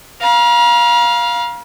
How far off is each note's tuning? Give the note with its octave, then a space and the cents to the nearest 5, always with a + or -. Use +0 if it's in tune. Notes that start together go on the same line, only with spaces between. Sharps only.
F5 +0 A#5 +45